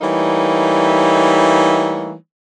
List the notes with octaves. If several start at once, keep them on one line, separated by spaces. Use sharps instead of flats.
E3 G3 A3 A#3 D#4 C#5